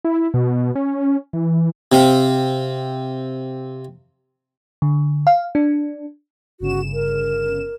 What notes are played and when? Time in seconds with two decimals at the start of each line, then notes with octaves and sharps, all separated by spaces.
0.05 E4
0.34 B2
0.76 C#4
1.33 E3
1.92 C3 C4 F5
4.82 D3
5.27 F5
5.55 D4
6.60 G1 C#3 F#4 E7
6.93 A#4